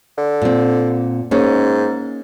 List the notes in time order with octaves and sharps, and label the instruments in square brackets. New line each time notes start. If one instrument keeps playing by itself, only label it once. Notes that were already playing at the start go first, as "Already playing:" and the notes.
[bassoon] D3
[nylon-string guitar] A#2 C4
[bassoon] G#2 [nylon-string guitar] A#3 C#4